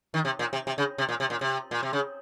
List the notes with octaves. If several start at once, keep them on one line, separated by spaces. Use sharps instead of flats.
D#3
C3
A#2
C3
C3
C#3
C3
A#2
C3
A#2
C3
A#2
C3
C#3